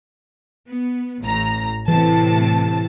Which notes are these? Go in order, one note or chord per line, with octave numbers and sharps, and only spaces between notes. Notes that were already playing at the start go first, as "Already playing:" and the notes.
B3
A1 A2 A#5
A2 C3 E3 A5